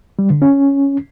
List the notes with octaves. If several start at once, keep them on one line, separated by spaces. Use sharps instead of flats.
G3
D3
C#4